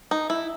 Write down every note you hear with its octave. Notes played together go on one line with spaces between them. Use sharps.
D#4
E4